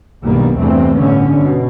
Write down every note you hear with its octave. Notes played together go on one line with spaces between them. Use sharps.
B1 G2 B2 D#3 G3 A#3
E2 G2 C3 E3 A3 C4
G1 A2 D3 C#4
B2